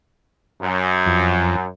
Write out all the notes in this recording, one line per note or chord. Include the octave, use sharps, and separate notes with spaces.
F#2
F2